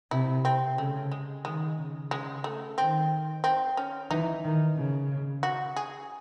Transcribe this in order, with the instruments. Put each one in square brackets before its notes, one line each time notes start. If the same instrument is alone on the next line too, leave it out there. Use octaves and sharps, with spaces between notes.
[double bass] C3 [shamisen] E4
[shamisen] C4
[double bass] C#3 [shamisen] A3
[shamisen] G#3
[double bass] D#3 [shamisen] G#3
[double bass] C#3
[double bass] C#3 [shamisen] G#3
[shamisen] A3
[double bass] D#3 [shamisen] C4
[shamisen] C4
C#4
[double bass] E3 [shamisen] D#4
[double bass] D#3
C#3
[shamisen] F#4
G#4